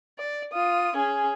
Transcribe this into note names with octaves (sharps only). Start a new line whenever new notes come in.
D5
F4 D#6
C#4 G#4